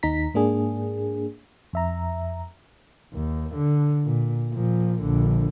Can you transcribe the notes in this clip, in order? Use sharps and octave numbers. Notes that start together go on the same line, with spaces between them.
D#2 D#4 A#5 B6
G#2 A#3 D4 G#4
F2 E5 A#5
D#2
D3
A#2
A#2 F3
A#1 D3